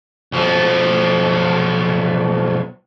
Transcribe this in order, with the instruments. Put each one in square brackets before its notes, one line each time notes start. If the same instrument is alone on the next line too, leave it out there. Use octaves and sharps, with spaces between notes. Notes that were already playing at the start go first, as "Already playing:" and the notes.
[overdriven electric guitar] B1 F3